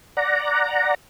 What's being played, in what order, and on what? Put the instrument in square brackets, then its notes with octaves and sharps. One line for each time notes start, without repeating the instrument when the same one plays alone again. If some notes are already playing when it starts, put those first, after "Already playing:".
[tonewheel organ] D5 F#5 A#5